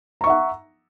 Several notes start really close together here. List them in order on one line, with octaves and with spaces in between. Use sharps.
A#5 C#6 E5 F#5